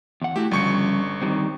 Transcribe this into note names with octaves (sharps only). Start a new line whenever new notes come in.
E2 F#5
A3 E4 F#4 G4
G1 C#3 F3 G3 C#6 C#7
D#3 G3 C4